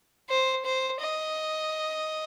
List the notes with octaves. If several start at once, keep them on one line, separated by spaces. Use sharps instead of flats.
C5
C5
D#5